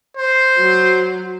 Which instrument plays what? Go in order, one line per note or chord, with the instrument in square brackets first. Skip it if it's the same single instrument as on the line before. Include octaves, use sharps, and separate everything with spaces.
[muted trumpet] C5
[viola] F#3